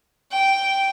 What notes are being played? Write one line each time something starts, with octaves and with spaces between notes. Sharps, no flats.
G5